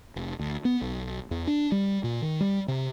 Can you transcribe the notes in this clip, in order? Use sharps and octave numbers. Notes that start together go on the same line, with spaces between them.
F1
D2
B3
B1
E2
D4
G3
A#2
D#3
G3
C3